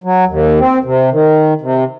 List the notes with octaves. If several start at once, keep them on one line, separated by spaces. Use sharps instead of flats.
F#3
D#2
C4
C3
D#3
C3